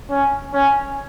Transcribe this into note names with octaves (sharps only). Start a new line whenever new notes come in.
C#4
C#4